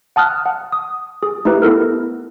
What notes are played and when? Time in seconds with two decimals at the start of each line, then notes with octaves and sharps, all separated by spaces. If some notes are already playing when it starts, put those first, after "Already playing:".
0.16 F#5 A5 D#6 F6 F#6
0.46 F#5
0.72 D#6
1.23 G#4
1.45 A3 D#4 E4 G4 B4
1.62 B3 E4 A4 A#4